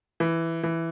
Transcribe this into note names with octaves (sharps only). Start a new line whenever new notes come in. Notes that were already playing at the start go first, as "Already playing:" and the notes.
E3
E3